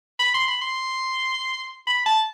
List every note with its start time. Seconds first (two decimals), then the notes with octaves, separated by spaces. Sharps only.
0.20 B5
0.34 C6
0.48 B5
0.62 C6
1.87 B5
2.06 A5